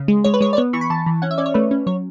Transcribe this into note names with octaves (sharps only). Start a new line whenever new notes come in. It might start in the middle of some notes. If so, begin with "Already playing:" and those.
Already playing: C#3
G#3
G#3 C#5
B4
G#3 C#5
D5
B3 C#5
E3 C#6
B5
E3 A5
E3
C#4 F#5
E5
C#4 D5
C#5
A3 B4
C#4
F#3 C#5